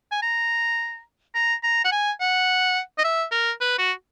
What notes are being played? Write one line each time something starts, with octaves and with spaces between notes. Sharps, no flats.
G#5
A#5
A#5
A#5
F#5
G#5
F#5
D#5
E5
A#4
B4
F#4